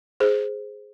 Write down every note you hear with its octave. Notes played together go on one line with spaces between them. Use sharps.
G#4 C5